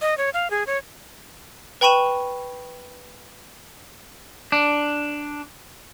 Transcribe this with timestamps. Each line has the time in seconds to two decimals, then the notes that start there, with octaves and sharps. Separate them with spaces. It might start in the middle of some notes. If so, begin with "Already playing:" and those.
0.01 D#5
0.18 C#5
0.34 F5
0.50 G#4
0.67 C#5
1.81 B4 G5 B5 C#6 D#7 E7
4.52 D4